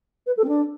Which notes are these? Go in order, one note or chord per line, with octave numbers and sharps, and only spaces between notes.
B4
A4
C4
D4